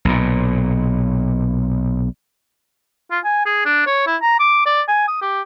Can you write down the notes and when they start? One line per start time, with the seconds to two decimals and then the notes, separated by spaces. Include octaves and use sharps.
0.05 B1 A#2
3.11 F4
3.24 G#5
3.45 G#4
3.65 D4
3.86 C#5
4.06 E4
4.22 A#5
4.39 D6
4.66 D5
4.88 G#5
5.07 D#6
5.21 G4